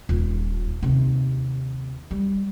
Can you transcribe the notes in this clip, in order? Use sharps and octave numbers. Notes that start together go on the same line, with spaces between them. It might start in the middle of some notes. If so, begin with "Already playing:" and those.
D#1
D#2 C3
G3